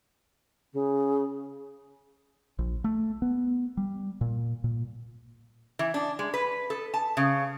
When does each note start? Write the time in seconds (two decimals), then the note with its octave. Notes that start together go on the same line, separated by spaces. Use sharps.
0.73 C#3
2.59 A#1
2.84 A3
3.22 B3
3.77 G3
4.21 A#2
4.64 A#2
5.79 E3
5.94 D4
6.19 G#3
6.34 B4
6.70 A4
6.94 A5
7.17 C#3